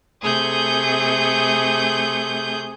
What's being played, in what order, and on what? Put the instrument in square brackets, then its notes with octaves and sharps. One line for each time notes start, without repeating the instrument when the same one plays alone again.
[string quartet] C3 A3 G#4 G6